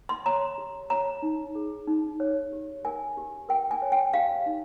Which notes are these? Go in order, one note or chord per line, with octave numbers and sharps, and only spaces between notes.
C6
C#5 A#5
G4
C#5 A#5
D#4
G#4
D#4
C#5
G4
A#4 G#5
G4
A#4 G5
G#5
C#5
G5
G4 F5
D#4